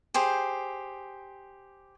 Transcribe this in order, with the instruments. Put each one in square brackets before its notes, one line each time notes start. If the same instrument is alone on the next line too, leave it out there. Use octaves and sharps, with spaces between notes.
[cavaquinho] G4 G#4 C5